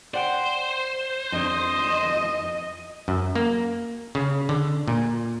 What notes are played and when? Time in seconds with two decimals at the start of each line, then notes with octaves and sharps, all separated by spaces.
0.14 C5 D5 F#5 G5
1.32 F2 D4 D#5
3.08 F#2
3.35 A#3
4.15 C#3
4.49 D3
4.88 A#2